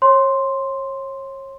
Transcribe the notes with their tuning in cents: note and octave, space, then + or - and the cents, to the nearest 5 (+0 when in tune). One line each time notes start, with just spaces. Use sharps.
C#5 -35 C6 +0